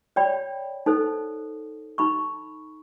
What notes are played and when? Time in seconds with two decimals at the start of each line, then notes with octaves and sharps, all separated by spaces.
0.16 C#5 D5 G5 B5
0.86 D#4 A4 C5
1.98 D#4 B5 C#6